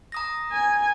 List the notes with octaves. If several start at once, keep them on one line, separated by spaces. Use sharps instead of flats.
A#5 D#6 A#6
G#5